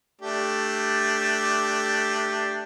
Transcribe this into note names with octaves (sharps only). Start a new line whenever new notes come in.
A3 D4 G4